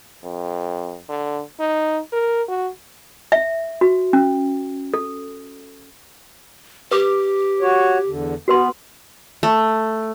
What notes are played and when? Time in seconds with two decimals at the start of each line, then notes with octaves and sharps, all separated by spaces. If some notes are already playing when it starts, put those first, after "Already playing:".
0.24 F2
1.09 D3
1.60 D#4
2.13 A#4
2.49 F#4
3.32 E5
3.81 F#4
4.13 C#4
4.94 A4
6.91 G4 B4 D6
7.61 F#4 C#5
8.07 E2 D3
8.48 B3 F#4 B4 C6
9.43 A3